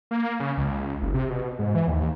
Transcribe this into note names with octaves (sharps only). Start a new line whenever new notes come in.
A#3
C#3
C#2
F#1
C3
B2
G#2
E3
D#2